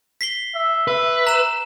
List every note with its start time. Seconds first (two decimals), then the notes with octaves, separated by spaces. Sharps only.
0.21 B6 C7 G7
0.55 E5
0.88 B4 E5
1.27 A#5 E7